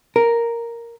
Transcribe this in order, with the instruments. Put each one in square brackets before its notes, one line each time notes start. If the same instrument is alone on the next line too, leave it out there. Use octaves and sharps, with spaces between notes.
[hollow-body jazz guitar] A#4